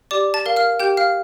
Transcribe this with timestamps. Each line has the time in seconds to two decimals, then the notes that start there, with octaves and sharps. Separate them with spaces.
0.11 G4 D5 D6
0.34 A5 A6
0.46 A#4 F5
0.56 F5 F6
0.79 G4 G5 G6
0.97 F5 F6